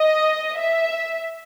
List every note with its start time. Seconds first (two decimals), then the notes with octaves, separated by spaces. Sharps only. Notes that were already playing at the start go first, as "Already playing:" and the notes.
Already playing: D#5
0.58 E5